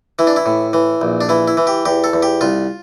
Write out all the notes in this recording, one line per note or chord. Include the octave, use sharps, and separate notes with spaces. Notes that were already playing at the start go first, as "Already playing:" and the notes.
E3 E4
D4
E4
A2
E3
A#1
D4
E3 E4
E4
E3
G4
E2 G4
A4
E2
G4
C2 F4